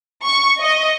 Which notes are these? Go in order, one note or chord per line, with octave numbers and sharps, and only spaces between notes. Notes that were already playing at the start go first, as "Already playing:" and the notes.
C#6
D#5